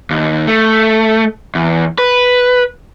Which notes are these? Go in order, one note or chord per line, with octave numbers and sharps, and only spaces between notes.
D#2
A3
E2
B4